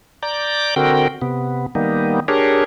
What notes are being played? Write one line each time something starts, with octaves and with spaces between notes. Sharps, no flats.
D5 A#5 D6 G6
D3 C4 F#4 A#4 G5
C3 B3
D#3 G3 A#3 B3 D#4
D4 G4 G#4 A#4 C#5